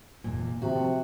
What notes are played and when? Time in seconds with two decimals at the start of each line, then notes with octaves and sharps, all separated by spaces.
0.24 F1 E2 A#2
0.62 A2 C3 D#3 F3 F#4